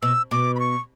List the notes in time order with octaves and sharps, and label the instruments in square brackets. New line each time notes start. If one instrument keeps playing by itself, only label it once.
[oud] B2 [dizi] E6
[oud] B2 [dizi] D6
[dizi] B5
C#6